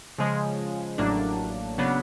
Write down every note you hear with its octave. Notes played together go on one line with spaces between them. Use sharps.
C#3 F3 G#3
A1 A2 F#3 A#3 D4
C#3 F#3 B3 D4